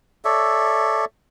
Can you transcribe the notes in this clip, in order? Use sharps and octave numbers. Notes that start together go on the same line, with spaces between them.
A4 C#5 D5 E5